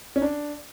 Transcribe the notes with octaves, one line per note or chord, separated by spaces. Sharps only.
C#4
D4